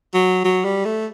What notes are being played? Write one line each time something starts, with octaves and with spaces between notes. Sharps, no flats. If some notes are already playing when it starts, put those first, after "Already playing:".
F#3
F#3
G3
A3